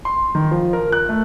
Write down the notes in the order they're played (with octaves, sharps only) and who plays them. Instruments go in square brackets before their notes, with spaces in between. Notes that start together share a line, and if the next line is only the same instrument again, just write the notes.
[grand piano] C6
D#3
F3
A#4
F#6
A3